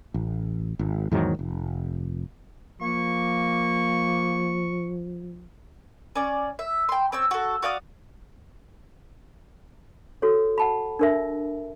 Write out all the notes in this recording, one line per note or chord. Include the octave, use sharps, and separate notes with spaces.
A1
G#1
E2 G#2 D#3 F#3
F1
F3 A#3 C#6
C#4 D5
E5
G5 C6
C4 C#4 E6
F#4 A4
F#4 D5 F5 D#6
F#4 A4 C#5
F#5 A5 B5
D4 A#4 E5